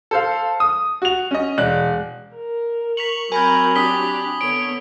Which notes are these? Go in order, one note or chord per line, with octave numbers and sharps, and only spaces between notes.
A4 C5 F5
D#6
F#4 F7
C#4 D#5
E1 D5 F#6
A#4
C#6 B6 F7 F#7
F#3 C4 A#4 G#5 B5 G6 G#6
D4 G4 D#6 B6 G7
D3 B3 C#5 D7